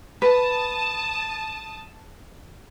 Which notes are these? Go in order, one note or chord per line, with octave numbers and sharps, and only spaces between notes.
B4 A5 D#6